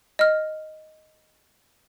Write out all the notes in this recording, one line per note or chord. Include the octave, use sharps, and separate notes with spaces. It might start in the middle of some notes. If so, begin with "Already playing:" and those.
D#5 F6